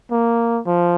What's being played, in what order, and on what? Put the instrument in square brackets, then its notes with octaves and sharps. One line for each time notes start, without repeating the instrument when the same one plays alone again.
[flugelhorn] A#3
F3